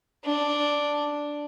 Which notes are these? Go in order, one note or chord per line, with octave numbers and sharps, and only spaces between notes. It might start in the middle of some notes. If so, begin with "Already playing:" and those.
D4